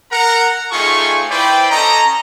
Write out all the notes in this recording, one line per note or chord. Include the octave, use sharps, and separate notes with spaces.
A#4 F#5 A#5
A3 C4 D#4 F4 G#4 C#6
E4 B4 C5 D5 G5
C#4 A4 D#5 A#5